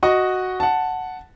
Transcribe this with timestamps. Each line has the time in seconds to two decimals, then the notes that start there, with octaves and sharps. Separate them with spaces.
0.03 F#4 D#5 C#6
0.60 F#5 A5